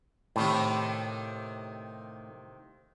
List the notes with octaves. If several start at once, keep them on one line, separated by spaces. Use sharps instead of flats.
A2 C3 D#3 A#3